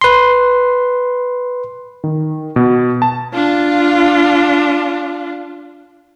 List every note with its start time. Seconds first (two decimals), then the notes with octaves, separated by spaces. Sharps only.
0.01 B4 C6
2.04 D#3
2.56 B2
3.02 A5
3.34 D4 F4